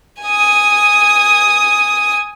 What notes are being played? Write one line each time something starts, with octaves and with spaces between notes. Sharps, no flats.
G#5 D#6